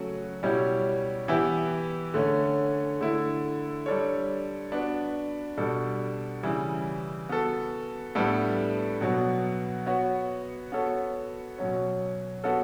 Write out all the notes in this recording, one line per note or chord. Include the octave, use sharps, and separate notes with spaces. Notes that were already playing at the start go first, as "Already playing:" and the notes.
Already playing: C#3 F#3 A3 C#4 F#4
B2 G3 C#4 E4 G4
E3 B3 E4 G4
D3 A3 C#4
D3 A3 E4
G3 D4 A4 C#5
B3 D4 F#4 B4
B2 G3 D4 A4
C#3 E3 G3
B3 F#4 A4
A2 G3 B3 D4 A4
B2 F#3 B3
B3 F#4 C#5
B3 F#4 A4 C#5
B2 F#3 C#4
B3 F#4 A4 C#5